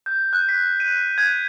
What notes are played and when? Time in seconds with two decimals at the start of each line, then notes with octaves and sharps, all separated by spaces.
0.06 G6
0.33 F#6
0.49 B6
0.80 D#7
1.18 G#6